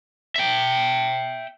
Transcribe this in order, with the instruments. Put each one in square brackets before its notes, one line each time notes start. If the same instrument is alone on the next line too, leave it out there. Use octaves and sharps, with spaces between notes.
[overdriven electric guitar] E5 G5